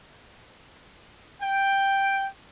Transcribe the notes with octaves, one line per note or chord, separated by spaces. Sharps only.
G5